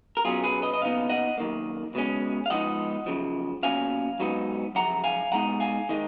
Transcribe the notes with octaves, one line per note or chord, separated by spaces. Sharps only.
A#4
B1 B2 F#3 C#4 F4 G#4
G#4 B4
B4 D#5
D#5
D#2 C#3 B3 D#4 F5
D#5 F#5
F#2 D#3 A#3
C#2 B2 G#3 C#4
F5
G#2 F3 B3 D#4 D#5 F#5
F#2 C#3 F3
B1 A#2 F#3 C#4 F5 G#5
G#2 F#3 B3 D#4
F#2 C#3 F3 F#5 A#5
F5 G#5
B2 G#3 D#4 F#5 A#5
F5 G#5
D#3 G#3 D#4